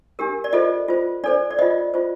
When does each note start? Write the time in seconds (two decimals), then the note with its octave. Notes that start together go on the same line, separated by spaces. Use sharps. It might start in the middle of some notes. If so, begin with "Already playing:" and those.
0.19 D4 G4 A#4
0.44 D5
0.53 F4 A4 C5 D#5
0.88 F4 C5
1.24 D4 A4 C5 D5
1.51 D5
1.59 F4 C5 D#5
1.94 F4 C5